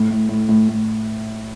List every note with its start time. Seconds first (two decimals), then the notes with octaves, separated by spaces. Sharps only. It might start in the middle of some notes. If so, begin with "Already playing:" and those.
Already playing: A2
0.11 A2
0.29 A2
0.49 A2
0.69 A2